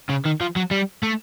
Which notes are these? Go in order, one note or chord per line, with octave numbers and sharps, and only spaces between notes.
C#3
D#3
F3
F#3
G3
A3